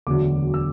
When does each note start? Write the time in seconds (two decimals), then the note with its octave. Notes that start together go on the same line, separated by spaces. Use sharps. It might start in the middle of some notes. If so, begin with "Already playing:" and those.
0.07 E1 D2 D3 F#3 D6
0.54 E6